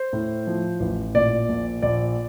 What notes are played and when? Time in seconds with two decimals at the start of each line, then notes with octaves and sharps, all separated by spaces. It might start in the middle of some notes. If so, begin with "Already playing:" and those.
Already playing: C5
0.13 A2
0.47 F3
0.80 A1
1.14 A#2 D5
1.49 A#1
1.82 A#1 D5